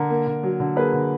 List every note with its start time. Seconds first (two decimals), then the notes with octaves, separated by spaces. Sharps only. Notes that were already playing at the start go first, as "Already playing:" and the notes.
Already playing: D3 A#4
0.10 A#3
0.27 D3
0.43 F#3
0.60 D3
0.76 A#3 G#4 B4
0.93 D3